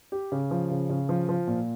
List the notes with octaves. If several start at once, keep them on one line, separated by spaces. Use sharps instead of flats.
G4
C#3
F3
C#3
C#3
F3
F3
A#2